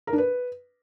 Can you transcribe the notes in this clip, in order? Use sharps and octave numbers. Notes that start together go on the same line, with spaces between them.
A#4
D4
B4